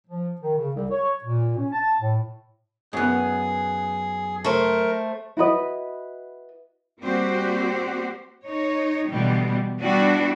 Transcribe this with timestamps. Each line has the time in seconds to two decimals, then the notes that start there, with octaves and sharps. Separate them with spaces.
0.07 F3
0.41 D#3
0.55 C#3
0.74 C2
0.91 C#5
1.24 A#2
1.57 C#4
1.73 A5
1.99 A2
2.93 F#2 B3 G#4
4.44 A3 A#4 C5
5.37 E4 F#4 B4 D#5
7.01 G3 A#3 C4 F#4 G4 C5
8.43 D#4 C#5
9.07 B2 D3 E3 G3
9.79 G3 B3 D4 E4 F#4